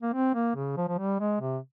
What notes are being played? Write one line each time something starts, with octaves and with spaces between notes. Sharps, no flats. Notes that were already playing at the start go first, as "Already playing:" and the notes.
A#3
C4
A#3
C#3
F3
F3
G3
G#3
C3